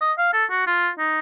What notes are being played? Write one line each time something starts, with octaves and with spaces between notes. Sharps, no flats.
D#5
F5
A4
F#4
F4
D#4